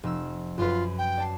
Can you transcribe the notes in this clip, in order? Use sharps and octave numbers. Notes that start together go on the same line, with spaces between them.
F1 E6
F#2 F4 B4
G5
D5 A5 C7